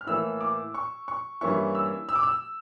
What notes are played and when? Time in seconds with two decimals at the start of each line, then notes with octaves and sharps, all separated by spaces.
0.01 F6
0.07 A2 E3 A#3 E6
0.41 D6
0.74 C#6
1.08 C#6
1.41 G2 E3 A#3 C#4 E4 C#6
1.75 E6
2.09 E6
2.15 D6
2.23 E6